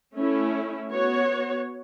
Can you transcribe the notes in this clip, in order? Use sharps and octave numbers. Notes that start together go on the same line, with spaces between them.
A3 C#4 E4
B3 F#4 C#5